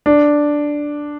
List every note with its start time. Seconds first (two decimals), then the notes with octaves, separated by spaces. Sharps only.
0.06 D4